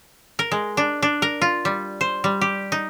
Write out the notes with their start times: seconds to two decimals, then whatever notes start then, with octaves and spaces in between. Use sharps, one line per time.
0.39 A#4
0.52 G#3
0.77 D4
1.02 D4
1.22 A#4
1.42 F4
1.65 G3
2.01 C5
2.24 G3
2.41 G4
2.72 D#4